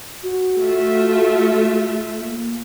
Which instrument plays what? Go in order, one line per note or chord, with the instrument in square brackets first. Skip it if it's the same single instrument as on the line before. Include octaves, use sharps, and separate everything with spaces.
[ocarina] F#4
[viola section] A3 F4 E5
[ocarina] A#3